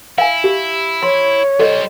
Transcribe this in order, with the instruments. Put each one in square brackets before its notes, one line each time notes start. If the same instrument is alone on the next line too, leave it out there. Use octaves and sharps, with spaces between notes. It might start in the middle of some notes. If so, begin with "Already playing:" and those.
[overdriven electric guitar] E4 [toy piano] F5 G#5
[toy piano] G4
[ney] C#5 [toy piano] C6
[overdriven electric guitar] G3 C5 [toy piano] A4 D#5